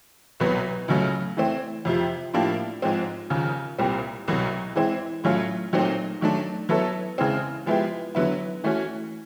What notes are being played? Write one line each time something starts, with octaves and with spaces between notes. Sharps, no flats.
C2 B2 F#3 B3
C#2 C#3 F#3 A3
E3 A3 C4
F2 C3 F3
A2 F3 A#3 D4 G4
G#2 F3 G#3 C4
D#2 C#3 F3
C2 A#2 G3 C4
C2 B2 F#3
E3 G#3 C4 E4
A2 F#3 A3 C#4 F4
A#2 F#3 A3 C4 D#4
D#3 F#3 A3 D4
F#3 B3 E4 A4 C#5
C#3 E3 G#3 C4
F3 G#3 B3 E4 G4
D3 F#3 B3 E4
E3 A3 C#4 F#4